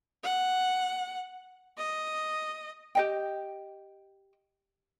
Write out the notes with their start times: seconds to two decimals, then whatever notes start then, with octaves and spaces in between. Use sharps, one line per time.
0.23 F#5
1.77 D#5
2.95 G4 D#5 G5